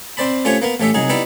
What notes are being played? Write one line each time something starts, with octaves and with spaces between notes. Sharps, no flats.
C4 C5 D5 A5 B5
A3 C#4 F4 G4 C5 C#5
A#3 B3 A#4
A1 A3 C#4 G4 E5
C2 F#3 D#4 G#4
B3 D#4 E4 G4 D5 G5